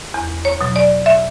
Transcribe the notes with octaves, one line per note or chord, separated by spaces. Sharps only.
E2
C#5
B2 F#3
D5
E5